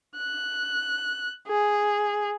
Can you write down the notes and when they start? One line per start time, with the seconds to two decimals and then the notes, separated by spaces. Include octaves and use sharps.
0.17 F#6
1.48 G#4